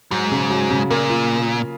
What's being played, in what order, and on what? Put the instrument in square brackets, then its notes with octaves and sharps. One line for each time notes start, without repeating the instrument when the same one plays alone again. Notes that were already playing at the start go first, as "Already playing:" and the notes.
[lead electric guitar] G#2 [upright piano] F#3
[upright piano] C#3
F#3
C#3
[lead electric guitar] A#2 [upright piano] A#3
[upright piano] F4